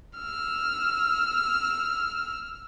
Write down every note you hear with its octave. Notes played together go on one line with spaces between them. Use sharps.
E6 F6